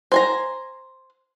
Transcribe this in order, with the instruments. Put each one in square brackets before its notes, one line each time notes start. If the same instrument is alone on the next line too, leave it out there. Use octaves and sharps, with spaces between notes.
[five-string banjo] C5 G#5 A#5